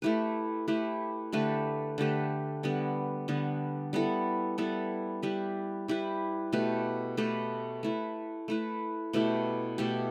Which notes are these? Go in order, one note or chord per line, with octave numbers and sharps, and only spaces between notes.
A3 E4 G4 B4
A3 E4 G4 B4
D3 A3 G4 B4
D3 A3 G4 B4
D3 G3 B3
D3 G3 B3
G3 B3 E4 A4
G3 B3 E4 A4
G3 E4 G4 B4
G3 E4 G4 B4
B2 A3 G4 B4
B2 A3 G4 B4
A3 E4 B4
A3 E4 B4
B2 A3 E4 G4
B2 A3 E4 G4